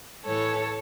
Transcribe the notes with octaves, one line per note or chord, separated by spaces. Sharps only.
A2 E3 A4 C#5